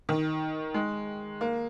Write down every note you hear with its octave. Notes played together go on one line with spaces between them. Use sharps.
D#3
G#3
A#3